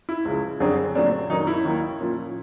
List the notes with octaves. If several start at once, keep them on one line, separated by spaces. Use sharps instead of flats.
E4
C#2 C#3 F3
F#2 D3 G3 C4 G#4
A#2 F#3 A3 C4 D4
F#2 D#3 F#3 D#4
E4
D#2 D#3 F#3
A#2 F3 A#3 C#4